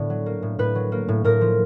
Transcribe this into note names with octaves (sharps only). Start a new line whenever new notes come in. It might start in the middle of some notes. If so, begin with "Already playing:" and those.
Already playing: A2 D3 B3
F#3
A#3
A2
A2 B4
F#3
A#3
A2
A2 A#4
F3